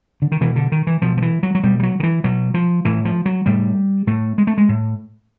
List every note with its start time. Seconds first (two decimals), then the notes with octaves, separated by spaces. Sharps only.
0.22 D3
0.32 D#3
0.41 B2 E3
0.56 D3
0.72 D#3
0.87 E3
1.02 B2 F3
1.17 F3
1.22 E3
1.43 F#3
1.55 F#3
1.63 B2 G3
1.80 G3
1.83 F#3
2.00 D#3
2.03 E3
2.24 B2 F#3
2.54 F3
2.85 A2 E3
3.05 F3
3.26 F#3
3.46 A2 G3
4.07 A2 A3
4.38 G#3
4.47 A3
4.58 G#3
4.69 A2